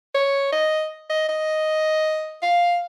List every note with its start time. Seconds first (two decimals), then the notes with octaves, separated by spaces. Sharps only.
0.14 C#5
0.52 D#5
1.10 D#5
1.29 D#5
2.42 F5